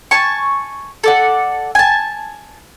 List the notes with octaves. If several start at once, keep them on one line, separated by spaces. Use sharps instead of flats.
G#5 A5 C#6
A4 D5 F#5
G#5 A5